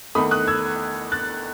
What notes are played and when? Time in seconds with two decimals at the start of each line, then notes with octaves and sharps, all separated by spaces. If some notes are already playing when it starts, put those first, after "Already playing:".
0.15 E2 D#3 A3 B5 D#6
0.31 D#6 F#6
0.47 E6 G#6
1.12 F#6 A6